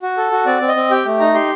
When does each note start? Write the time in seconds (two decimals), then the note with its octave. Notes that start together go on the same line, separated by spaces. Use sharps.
0.02 F#4
0.17 A4
0.32 F#4
0.46 C4 D5
0.61 C4
0.68 D#5
0.76 C4
0.91 G4 G5
1.05 A3
1.20 D#4 A#5
1.34 G4 C6